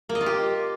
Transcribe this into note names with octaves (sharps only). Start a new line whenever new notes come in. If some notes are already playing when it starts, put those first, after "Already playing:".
A#3
D#5
F4
G4